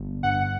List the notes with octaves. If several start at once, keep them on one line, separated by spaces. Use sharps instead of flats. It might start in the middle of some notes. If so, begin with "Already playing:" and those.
Already playing: G1
G2 F#5